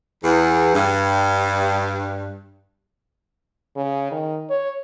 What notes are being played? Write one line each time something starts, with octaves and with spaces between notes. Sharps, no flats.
E2
G2
C#3
D#3
C#5